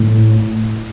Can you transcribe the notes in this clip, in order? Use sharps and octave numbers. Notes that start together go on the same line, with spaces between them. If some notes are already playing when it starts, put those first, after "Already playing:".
Already playing: A2